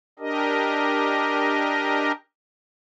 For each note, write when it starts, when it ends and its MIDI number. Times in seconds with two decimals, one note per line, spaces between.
0.19 2.12 62
0.19 2.12 67
0.19 2.12 70
0.19 2.12 75